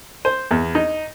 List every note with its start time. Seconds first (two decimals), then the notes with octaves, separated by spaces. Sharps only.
0.25 C5
0.51 E2
0.75 D#4